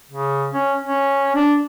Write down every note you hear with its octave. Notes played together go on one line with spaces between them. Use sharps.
C#3
C#4
C#4
D4